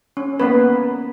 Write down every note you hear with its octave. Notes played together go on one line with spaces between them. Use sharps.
C#4
A#3 B3 B4